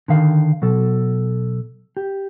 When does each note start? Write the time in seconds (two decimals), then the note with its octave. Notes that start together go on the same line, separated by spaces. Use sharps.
0.08 D3 D#3 F5
0.62 B2 F#3 A4
1.97 G4